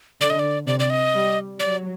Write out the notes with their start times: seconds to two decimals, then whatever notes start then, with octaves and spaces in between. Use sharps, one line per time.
0.21 D3 D5
0.30 D#5
0.39 D5
0.67 C3 D5
0.79 D5
0.90 D#5
1.14 G3
1.60 F#3 D5